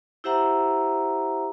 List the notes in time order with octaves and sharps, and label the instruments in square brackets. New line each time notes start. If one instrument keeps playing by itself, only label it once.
[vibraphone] E4 G4 C5 E5 F#5 A#5